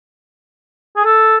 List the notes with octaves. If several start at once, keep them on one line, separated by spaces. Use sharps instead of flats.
G#4
A4